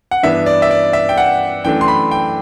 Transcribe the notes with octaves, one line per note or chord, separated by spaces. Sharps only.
F#5
G2 E3 B3 D4 E5
D5
E5
D5
E5
G5
F#5
F#2 E3 A3 D4 G5
C6
B5
G5